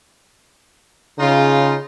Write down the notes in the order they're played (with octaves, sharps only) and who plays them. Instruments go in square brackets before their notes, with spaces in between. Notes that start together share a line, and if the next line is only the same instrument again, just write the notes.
[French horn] C#3 [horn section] D#4 F4